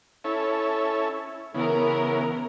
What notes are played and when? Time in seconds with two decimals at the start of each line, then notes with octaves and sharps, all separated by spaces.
0.24 C#4 E4 A4
1.54 C#3 E3 B3 A#4